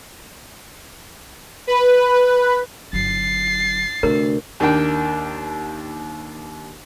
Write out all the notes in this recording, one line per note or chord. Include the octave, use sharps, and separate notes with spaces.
B4
G1 F#3 A6 C7
D2 C3 A#4
D#2 A#3 D4 G5